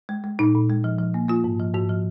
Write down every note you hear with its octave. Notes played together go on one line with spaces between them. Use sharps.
G#3
G#3
A#2 D#4
A#2
G#3
F3
F3
A#3
A#3 F4
G#2
F3
G#2 F#4
F3